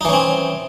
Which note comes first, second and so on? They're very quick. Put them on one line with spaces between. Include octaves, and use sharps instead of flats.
D#4 E3 C#4 C4